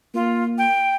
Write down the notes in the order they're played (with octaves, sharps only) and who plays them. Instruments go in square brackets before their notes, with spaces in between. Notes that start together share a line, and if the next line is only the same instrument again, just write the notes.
[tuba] A#3 [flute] F4
[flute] G5